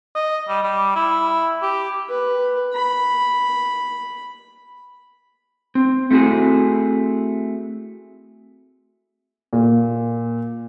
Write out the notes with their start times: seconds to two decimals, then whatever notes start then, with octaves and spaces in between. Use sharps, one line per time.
0.15 D#5
0.48 G3
0.63 G3
0.95 E4
1.62 G4
2.10 B4
2.74 B5
5.75 C4
6.11 A3 C4 E4 F#4 G#4
9.53 A#2